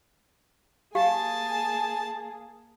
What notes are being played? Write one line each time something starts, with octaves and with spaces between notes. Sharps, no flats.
A#3 G4 G#4 F5 G#5 A5